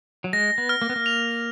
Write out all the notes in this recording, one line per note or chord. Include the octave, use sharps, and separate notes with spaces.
F#3
G#3 A#6
B3
F6
A#3
B3
A#3
F7